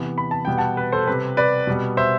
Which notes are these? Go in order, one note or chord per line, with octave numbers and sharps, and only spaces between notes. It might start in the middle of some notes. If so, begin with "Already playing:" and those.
Already playing: C3 E3 B3
B5
A5
B2 G3 B3 G5
F#5 A5
B4
A4 C5
C3 G3 C4 B4
B4 D5
B2 G3 B3
C5 E5